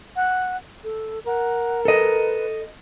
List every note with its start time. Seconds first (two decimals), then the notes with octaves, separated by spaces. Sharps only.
0.16 F#5
0.84 A4
1.27 A#4 F#5
1.85 A4 B4 D#5